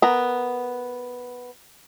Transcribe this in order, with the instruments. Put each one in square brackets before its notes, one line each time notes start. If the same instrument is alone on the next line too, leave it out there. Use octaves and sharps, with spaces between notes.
[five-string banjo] B3 A#4 A#5